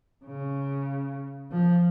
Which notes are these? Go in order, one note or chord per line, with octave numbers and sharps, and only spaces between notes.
C#3
F3